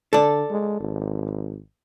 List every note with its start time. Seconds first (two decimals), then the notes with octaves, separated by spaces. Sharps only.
0.13 D3 A4 D5
0.50 G#3
0.80 G#1